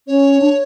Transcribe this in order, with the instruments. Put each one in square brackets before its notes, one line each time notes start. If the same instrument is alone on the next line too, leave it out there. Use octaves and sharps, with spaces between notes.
[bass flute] C#4 [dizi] C#5
[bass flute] D4